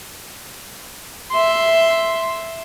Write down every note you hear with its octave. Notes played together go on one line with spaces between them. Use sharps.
E5 C6